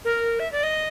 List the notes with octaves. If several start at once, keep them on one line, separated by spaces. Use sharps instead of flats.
A#4
E5
D5
D#5